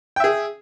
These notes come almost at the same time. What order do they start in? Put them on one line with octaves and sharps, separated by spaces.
G5 E5 G#4